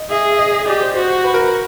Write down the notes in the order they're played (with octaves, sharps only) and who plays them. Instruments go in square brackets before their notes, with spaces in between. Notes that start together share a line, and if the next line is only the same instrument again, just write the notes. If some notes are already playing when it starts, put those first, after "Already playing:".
Already playing: [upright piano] D#5
[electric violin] G#4 [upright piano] E5
[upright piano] E5
D#5
D#5
[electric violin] G4 [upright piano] D5
[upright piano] C5
[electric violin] F#4 [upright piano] C5
[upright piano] B4
A#4
B4